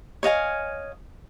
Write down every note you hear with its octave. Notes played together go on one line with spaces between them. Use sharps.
C#5 D#5 F5 G#5